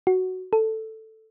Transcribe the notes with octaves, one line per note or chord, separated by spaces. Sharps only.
F#4
A4